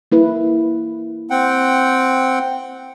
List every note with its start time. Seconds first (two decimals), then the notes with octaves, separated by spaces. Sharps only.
0.12 A#3 E4 B4
1.30 C4 F#5 G5